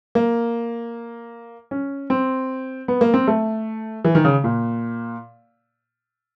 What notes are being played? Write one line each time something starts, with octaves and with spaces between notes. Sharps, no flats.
A#3
C#4
C4
B3
A#3
C4
A3
E3
D#3
C#3
A#2